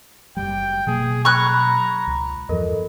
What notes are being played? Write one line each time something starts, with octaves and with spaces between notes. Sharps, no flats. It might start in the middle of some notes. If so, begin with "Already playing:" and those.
F#1 D#2 G3 G5
B2 F#3 A#3 G#4
A#5 B5 C#6 F#6 G#6
B5
C#2
E2 G2 F3 A4 A#4 D#5